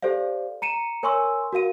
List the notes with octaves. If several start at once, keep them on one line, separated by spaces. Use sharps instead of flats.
G4 A4 C5 D5 F5
A#5 C#7 D#7 E7
A#4 C#5 G#5 C6 C#6 E6
F#4 A#4 F5 D#7